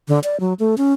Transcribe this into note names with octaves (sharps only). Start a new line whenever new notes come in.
D3
D5
F#3
A3
C#4